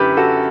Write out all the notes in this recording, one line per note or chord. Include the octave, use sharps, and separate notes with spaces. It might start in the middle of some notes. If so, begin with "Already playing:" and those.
Already playing: F#2 D3 E4 G4 B4
F#4 A4